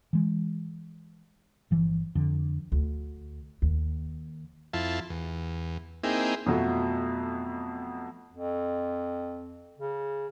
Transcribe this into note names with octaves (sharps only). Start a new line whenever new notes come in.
E3 G#3
G1 E3 F3
F2 D3
D2
D#2
F2 E4 F4 A5
E2
A#3 C4 D#4 E4 G#4 G5
F2 B2 F#3 A3 F4
F2
C#3